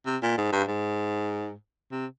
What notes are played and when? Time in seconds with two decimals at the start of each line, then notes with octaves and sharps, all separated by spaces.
0.06 C3
0.23 A#2
0.38 G#2
0.52 G2
0.68 G#2
1.92 C3